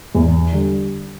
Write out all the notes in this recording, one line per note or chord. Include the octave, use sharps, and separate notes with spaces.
E2
D3 G3